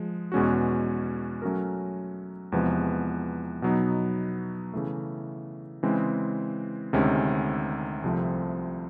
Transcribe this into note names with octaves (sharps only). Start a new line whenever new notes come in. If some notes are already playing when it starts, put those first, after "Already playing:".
Already playing: F3 G#3
E2 B2 G#3 C#4 F#4
F#3 A3 C#4 F#4 A#4
E2 C3 F3 G#3 B3
B2 F#3 B3 D#4
C#3 E3 A3
C#3 E3 G#3 C4
D2 C3 D#3 G#3 C#4
C2 C3 F3 A3 C4